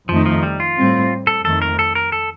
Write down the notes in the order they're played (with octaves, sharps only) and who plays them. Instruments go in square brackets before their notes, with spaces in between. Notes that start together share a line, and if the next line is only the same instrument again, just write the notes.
[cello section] F2 D#3 A3 D#4 [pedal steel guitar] F3
[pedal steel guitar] F3
G3
F4
[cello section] A2 G3 C4
[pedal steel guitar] A4
[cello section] F2 D#3 A3 [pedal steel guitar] A4
[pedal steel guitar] A#4
A4
A#4
A4